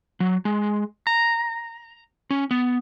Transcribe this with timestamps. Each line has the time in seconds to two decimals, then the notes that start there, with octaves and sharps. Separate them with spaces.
0.20 F#3
0.45 G#3
1.07 A#5
2.31 C#4
2.51 B3